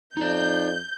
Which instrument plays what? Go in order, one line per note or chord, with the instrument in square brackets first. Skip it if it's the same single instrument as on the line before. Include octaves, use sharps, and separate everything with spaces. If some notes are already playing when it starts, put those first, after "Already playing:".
[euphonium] F2 [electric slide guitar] D#4 D5 [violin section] G6